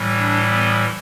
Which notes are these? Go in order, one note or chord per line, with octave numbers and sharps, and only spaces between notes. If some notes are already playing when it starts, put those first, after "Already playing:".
Already playing: A2 E3 G3
D4
B3